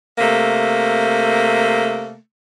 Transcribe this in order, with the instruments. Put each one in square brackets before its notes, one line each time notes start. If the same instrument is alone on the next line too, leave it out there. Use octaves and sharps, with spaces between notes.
[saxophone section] C3 A3 A#3